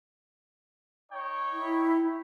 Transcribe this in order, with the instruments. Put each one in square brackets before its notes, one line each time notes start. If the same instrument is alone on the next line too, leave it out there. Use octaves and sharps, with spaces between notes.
[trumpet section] D#4 C#5 G5
[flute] E4